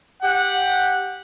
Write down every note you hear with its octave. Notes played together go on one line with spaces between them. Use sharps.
G4 F#5